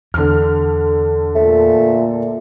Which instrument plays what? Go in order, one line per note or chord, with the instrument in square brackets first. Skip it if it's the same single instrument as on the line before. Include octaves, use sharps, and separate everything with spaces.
[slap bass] E2 [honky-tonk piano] D3 F6
[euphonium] A#2 [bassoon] A3